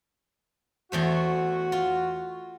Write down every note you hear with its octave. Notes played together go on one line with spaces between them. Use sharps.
E2 A3 F#4 C5
F4